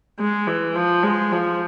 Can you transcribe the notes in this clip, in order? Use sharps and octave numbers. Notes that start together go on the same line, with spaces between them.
G#3
E3
F3
G#3
F3